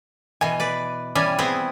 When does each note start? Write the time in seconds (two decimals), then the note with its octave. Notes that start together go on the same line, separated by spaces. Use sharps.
0.41 B2 E3 G#5
0.60 B4 D5
1.15 E3 G3 C#4 D5 G#5
1.39 B3 C4 E4 G#4